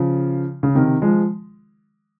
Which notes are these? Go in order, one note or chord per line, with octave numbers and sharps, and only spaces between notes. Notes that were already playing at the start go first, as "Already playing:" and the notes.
Already playing: C#3 F3
C#3
C3 D#3
F3 G#3